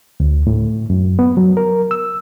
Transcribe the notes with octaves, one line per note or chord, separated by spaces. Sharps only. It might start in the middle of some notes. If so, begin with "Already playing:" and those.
D2
A2
F#2
B3
F#3
A#4
E6